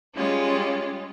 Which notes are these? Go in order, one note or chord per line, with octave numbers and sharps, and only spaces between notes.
G3 G#3 C#4 F4